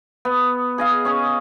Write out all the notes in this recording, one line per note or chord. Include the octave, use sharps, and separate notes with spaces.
B3
G#4 D#5 F5
C#4 G#4